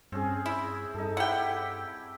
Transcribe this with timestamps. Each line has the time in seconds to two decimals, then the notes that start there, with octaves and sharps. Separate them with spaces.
0.12 G2 C4 C#4 G#4
0.46 E4
0.95 G2 D#4 A4
1.17 E4 G4 F#5 G5